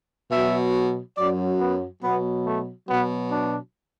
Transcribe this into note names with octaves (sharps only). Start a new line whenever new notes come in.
B2 F#3 E5
F#2 F#3 D5
B3
B2 F#3 B3
A3
B2 F#3 B3
D4